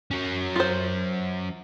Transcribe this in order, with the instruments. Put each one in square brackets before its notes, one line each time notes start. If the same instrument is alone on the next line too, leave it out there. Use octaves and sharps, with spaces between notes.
[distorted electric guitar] F#3 C#4
[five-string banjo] F4 C5